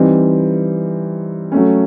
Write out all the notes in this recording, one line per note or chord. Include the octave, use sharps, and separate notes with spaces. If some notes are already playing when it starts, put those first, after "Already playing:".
Already playing: E3 G3 C4 D#4
F#3 A3 C#4